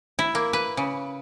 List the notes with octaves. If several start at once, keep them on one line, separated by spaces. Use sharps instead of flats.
E4
A#3
B4
C#3